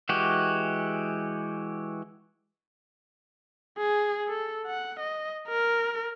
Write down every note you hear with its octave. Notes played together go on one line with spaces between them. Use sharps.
E3 G#3 F#4 G4
G#4
A4
F#5
D#5
A#4